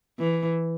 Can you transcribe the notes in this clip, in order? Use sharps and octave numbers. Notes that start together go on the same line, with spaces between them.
E3